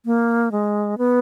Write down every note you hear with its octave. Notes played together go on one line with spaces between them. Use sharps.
A#3
G#3
B3